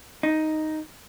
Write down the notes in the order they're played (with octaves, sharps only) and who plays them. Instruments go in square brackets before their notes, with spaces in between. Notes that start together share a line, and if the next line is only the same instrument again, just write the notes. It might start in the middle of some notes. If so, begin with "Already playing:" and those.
[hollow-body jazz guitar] D#4